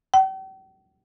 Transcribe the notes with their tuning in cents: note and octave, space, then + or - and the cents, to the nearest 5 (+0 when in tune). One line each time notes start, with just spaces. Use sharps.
G5 -45